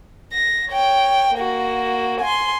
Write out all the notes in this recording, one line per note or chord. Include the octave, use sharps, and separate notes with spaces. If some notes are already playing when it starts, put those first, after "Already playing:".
A#6
C#5 G5
A#3 F#4
G#5 C6